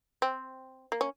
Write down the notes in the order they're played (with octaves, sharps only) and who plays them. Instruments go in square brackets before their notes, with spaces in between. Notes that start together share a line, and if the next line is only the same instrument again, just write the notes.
[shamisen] C4
A#3
C#4